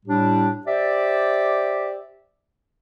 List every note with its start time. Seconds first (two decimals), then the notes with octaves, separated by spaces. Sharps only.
0.06 A2 G3 D4 G4
0.67 G4 C5 D5 E5